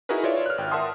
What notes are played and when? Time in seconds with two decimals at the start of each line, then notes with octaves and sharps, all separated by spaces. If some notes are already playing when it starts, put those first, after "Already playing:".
0.09 D#4 E4 F#4 G#4 A#4 B4
0.24 F4 C#5 D5 E5
0.46 F6 F#6
0.58 G#1 G5
0.71 A#4 E5 F#5 A5 C6 D#6